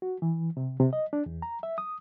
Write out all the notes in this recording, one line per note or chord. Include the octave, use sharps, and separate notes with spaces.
F#4
E3
C3
C3
D#5
D4
E2
A#5
E5
D#6